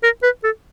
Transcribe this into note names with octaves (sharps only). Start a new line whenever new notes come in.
A#4
B4
A4